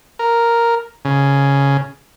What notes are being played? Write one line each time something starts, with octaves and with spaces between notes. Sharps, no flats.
A#4
C#3